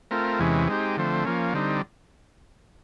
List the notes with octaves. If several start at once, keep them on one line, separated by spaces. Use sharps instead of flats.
A3 C4 F4 A#4
E2 C3 E3 G#3 C#4
G#3 C4 D#4 G4
D3 F3 A3 C4
F3 A#3 C#4
D3 G3 C4 D#4